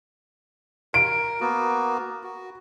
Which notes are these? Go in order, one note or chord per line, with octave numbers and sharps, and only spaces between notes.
A#4 D7
A#3 B3 F#4
F#4